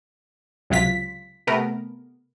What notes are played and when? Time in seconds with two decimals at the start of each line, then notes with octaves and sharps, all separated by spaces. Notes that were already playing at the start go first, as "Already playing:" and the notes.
0.70 C#2 C3 F#3 F4 B6
1.47 C3 A3 B3 A#4